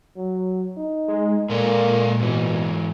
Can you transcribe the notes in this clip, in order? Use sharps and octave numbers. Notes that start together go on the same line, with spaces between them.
F#3
D#4
G#3
A#2 G#3 A#3 A4 D5
G#2 B2 E3